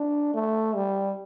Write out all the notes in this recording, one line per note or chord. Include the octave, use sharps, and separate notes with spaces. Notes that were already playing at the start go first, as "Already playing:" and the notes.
Already playing: D4
A3
G3